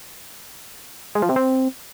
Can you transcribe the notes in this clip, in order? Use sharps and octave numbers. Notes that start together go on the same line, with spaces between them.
G#3
F3
C3
C4